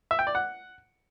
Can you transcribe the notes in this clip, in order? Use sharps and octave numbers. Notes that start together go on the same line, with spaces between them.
E5
G5
D5
F#5